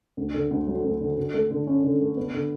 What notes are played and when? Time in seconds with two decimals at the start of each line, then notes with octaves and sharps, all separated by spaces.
0.17 D2
0.34 D3
0.51 D2
0.67 F#3
0.84 D2
1.01 D3
1.17 D3
1.34 A3
1.51 D3
1.67 C#4
1.84 D3
2.00 A3
2.17 B3
2.34 D3